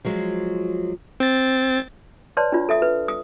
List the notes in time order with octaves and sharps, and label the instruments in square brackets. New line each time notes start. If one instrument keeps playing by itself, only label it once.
[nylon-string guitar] F3 F#3 G#3
[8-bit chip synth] C4 A6
[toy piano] B4 C#5 D5 A5 C6
D4 F4
A4 E5 D#6
B4
D#6